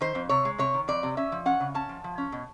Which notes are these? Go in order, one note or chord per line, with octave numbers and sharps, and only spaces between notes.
D#3 C5
F2
C3 C#5
G#3
C3 C#5
D#3
F2 D5
C3
C#4 E5
F3
C#4 F#5
C#3
C#4 A5
F3
F3
C#4
B2